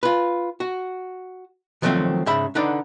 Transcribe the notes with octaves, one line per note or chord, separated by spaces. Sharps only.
F4 B4
F#4
D#3 F3 F#3 A3 C4
G#2 C#3 E5 B5
D3 D4 D#4 B4 D5 F#5